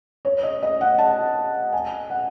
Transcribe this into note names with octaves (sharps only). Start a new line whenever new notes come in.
C#5
D#5
D#5
F#5
A5
G#5
F#5